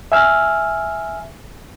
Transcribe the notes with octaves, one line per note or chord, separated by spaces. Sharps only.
E5 G#5 E6 F6